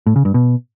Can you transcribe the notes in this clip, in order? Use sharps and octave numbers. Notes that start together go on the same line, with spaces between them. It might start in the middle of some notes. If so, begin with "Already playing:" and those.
A2
C#3
G2
B2